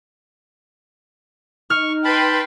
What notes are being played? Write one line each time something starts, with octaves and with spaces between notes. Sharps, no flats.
D#4 C#6 F6
B4 G5 A5 B5 C6